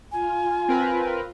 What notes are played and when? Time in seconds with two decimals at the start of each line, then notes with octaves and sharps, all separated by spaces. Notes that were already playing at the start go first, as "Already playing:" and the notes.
0.12 F4 G#5
0.69 C4 A#4 B4